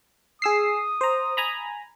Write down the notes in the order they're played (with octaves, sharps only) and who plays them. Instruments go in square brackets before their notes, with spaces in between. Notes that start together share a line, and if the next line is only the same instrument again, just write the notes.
[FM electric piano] G#4 E6 C7 [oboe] D#6
[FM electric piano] C5 A#5
G#5 A#5 B5